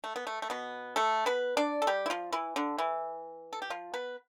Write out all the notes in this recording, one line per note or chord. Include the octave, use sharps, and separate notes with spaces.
A3
B3
A3
A3
B2 B3
A3 A4
B3 B4
D4 D5
A4
G3 G4
E4
F3 F4
E3 E4
D3 D4
E3 E4
A4
G4
F3 F4
B3 B4